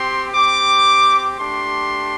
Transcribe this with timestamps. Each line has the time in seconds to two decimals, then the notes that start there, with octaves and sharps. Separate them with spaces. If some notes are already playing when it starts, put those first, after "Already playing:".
Already playing: C4 G4 C6
0.33 C4 G4 D6
1.39 A3 D4 G4 C6